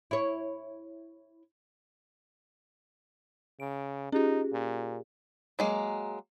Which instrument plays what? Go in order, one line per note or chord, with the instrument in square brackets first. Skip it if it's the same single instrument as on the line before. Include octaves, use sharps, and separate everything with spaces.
[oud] E4 C#5
[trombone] C#3 [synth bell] D7
[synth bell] C#4 F4 [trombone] D#4 [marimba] G4 G#4
[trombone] A#2
[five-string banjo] F#3 G#3 A#3